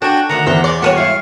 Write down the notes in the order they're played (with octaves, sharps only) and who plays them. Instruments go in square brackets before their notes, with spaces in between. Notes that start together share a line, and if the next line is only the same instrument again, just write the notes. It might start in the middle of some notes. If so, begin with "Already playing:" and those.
[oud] D4 [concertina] F#4 G5 [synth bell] A4 G#5
[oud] D2 D3 D#3 [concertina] F#5 A#5
[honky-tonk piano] E2 [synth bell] C5 E5
[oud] D5 [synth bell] G#5 C6
[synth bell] G3 A4 D#7 [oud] F#4 A#4 C#5 [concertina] F#5
[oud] G#2 E4 [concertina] F5 C#6